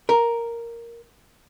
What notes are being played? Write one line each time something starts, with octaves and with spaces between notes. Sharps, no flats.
A#4